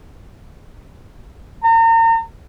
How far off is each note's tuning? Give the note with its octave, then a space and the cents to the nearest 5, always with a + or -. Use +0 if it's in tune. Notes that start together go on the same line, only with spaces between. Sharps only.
A#5 -35